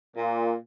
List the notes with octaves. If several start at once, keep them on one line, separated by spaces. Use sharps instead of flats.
A#2